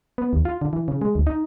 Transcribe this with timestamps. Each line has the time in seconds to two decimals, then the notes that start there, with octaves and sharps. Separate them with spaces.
0.18 B3
0.33 D#2
0.45 F4
0.61 D3
0.73 E3
0.88 C#3
1.02 G#3
1.15 D2
1.27 D#4